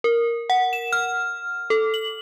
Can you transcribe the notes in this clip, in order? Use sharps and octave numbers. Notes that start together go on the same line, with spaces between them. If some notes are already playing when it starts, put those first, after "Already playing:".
A#4
F#5
E7
F6
A4
F#7